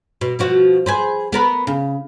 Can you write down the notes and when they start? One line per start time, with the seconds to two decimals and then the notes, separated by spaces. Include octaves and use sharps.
0.21 B2
0.39 B2 F3 F#4
0.86 G#4 B4 C5
1.32 B3 A#4 B4
1.67 C#3